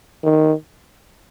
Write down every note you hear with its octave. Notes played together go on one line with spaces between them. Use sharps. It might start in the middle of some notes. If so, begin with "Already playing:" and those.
D#3